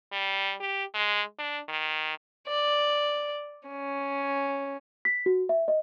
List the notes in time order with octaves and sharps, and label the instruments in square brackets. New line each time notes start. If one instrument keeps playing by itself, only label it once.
[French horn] G3
G4
G#3
D4
D#3
[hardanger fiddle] D5
C#4
[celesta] B6
F#4
E5
D#5